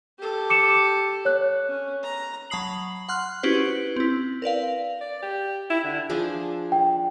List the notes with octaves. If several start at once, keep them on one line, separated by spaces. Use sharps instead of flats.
G4 A4
D6 C#7 E7
C#5 F#6
C#4
A#5
F#3 A5 B5 D#6 C7 F#7
F#5 C6 F6 F#6
C#4 E4 F#4 G4 B4 C5
C4 E4
A#4 B4 D5 F5
D5
G4
E4
D3
F3 D4 G#4
G5